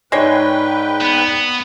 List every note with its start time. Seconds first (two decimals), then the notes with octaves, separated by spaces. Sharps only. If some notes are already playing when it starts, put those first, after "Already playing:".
0.12 G#2 G#3 D#4 B4 C#5 D5 G5
1.01 B3